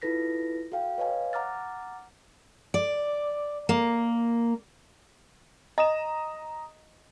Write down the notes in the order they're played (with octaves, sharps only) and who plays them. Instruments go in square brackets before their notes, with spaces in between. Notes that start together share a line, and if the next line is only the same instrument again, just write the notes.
[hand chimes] E4 F4 A4 B4 A#6 B6
F#4 A4 F5 G5
B4 C#5 D#5 F5 G#5
F#5 A#5 D6 F6 A6
[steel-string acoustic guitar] D5
A#3
[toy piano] D#5 [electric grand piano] A#5 D#6 E7